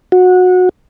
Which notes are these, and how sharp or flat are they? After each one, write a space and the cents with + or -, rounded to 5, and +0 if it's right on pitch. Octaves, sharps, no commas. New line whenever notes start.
F#4 -20